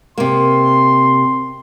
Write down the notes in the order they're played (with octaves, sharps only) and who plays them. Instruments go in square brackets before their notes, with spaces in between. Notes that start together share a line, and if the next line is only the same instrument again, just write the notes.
[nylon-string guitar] C3 A#3 [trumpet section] C6